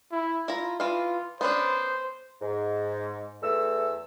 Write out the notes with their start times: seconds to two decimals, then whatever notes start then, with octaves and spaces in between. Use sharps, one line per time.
0.12 E4
0.48 E4 F4 A#5
0.80 E3 F4 F5
1.41 B3 C#4 D4 C5
2.41 G#2
3.42 E2 A3 E6